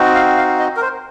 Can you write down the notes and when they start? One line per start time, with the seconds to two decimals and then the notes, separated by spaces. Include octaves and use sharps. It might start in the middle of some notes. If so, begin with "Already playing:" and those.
Already playing: C4 D#4 F#4
0.15 F5
0.37 F5
0.59 D#5
0.76 A#4
0.82 C5